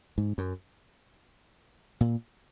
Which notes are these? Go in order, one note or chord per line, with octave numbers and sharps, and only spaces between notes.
G#2
F#2
A#2